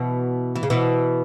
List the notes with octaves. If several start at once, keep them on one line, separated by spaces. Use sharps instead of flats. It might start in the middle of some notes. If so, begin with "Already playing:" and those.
Already playing: B2 E3
E3
C#3
B2 E3